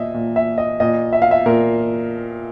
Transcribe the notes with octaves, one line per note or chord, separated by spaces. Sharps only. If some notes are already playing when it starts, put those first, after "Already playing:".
Already playing: A#2 D#5 E5
A#2
E5
D#5
A#2 D#5
E5
F5
E5
A#2 A#4